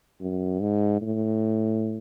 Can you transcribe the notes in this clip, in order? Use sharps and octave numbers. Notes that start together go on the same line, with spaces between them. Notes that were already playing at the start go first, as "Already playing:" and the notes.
F#2
G#2
A2